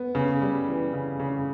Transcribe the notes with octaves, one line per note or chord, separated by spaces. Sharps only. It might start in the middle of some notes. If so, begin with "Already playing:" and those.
Already playing: B3
C#3
G3
E3
C#3
C#3